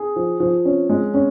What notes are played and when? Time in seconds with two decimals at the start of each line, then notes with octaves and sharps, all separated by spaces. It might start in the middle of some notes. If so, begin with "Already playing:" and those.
Already playing: G#4
0.16 F3
0.40 F3
0.65 C#4
0.89 G#3
1.14 C#4